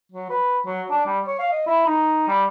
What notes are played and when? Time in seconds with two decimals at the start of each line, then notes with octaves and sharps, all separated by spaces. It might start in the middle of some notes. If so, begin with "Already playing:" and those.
0.12 F#3
0.30 B4
0.65 F#3
0.90 D4
1.06 G3
1.27 C#5
1.39 F5
1.51 D#5
1.67 E4
1.86 D#4
2.28 G3